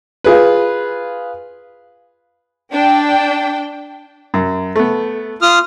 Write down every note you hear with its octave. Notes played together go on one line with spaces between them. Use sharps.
F4 G#4 B4
D4 G5
F#2
A3 B3
F4 D#6 F6